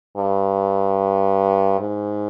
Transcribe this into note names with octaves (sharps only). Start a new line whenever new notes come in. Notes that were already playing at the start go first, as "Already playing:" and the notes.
G2
G#2